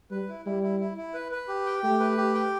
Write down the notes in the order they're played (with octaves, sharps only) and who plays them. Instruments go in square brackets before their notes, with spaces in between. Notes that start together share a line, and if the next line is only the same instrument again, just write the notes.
[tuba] G3 [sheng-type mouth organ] B4
[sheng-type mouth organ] E4
[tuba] G3 [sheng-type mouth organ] E4
[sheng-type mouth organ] E4
E4
E4
B4
B4
G4
G5
[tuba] A3 [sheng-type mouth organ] G4
[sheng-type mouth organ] B4
G4
G5